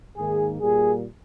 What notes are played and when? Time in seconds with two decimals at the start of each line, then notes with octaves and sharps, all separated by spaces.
0.17 G#2 D#3 A#3 G#4
0.61 A#2 G3 A#3 G#4